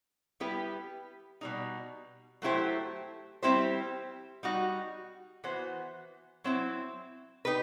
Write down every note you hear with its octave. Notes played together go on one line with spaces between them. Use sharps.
G3 B3 E4 G4 B4
B2 G3 D#4
F#3 A3 E4 G4 C5
G3 C4 E4 G4 C5
G3 D#4 F#4
E3 B3 F#4 C5
F#3 C4 E4
D#4 G4 B4